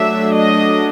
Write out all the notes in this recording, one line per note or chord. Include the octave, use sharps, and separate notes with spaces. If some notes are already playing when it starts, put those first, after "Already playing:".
Already playing: F#3 A3 D4 E5
D#5